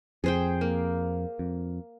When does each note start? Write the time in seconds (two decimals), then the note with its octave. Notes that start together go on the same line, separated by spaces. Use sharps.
0.24 F2 G#4 C5 G5
0.61 A#3
1.39 F2